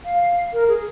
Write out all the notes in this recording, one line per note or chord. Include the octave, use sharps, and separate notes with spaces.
F5
A#4
G#4